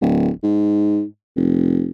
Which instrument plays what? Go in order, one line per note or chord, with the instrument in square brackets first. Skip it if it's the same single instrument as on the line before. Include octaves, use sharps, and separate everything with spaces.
[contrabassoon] D1
G#2
F1